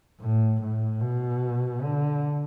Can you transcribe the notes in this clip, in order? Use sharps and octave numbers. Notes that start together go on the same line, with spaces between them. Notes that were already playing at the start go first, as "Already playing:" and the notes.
A2
A2
B2
D3